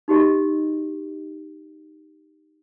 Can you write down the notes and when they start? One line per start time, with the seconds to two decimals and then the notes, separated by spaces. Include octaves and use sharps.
0.08 D#4 F#4 G4 D#5